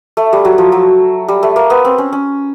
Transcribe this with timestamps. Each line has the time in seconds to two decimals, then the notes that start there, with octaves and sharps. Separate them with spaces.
0.17 A3
0.33 G3
0.45 F#3
0.58 F3
0.72 F#3
1.28 G3
1.43 A3
1.56 A#3
1.70 B3
1.85 C4
1.98 C#4
2.13 C#4